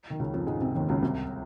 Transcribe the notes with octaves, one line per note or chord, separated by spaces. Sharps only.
D#3
C#2 C#3
F2 F3
G#2 G#3
C3 C4
D#2 D#3
C#2 C#3
C2 C3